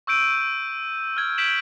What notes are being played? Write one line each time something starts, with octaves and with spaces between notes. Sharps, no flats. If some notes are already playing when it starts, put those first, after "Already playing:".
C#6 E6 G6 D7 D#7
F6 G#6 D#7
G6 B6 D7 E7 F#7